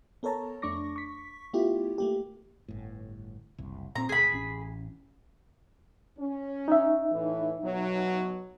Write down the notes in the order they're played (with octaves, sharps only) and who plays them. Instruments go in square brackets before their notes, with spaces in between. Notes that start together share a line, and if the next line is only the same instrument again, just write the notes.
[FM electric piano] B3 A4 A#4 C#5 A5 A#5
F2 A3 D4 C#6 D6 A#6
C#6 B6
A3 B3 E4 F4 G4
A3 A#3 G4
[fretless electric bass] G1 A2
F#1 C2
[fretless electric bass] A#2 C4 [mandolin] A#5
[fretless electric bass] D2 B2 [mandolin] G#4 B5
[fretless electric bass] A1 C#4
[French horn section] C#4
[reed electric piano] D#4 E5
[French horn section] A2 E3
B2 F#3